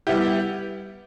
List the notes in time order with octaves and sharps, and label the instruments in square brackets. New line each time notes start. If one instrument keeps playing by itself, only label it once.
[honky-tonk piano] G3 B3 E4 G4